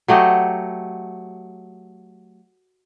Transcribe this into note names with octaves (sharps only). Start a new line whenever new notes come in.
F#3 A3 G4 D#5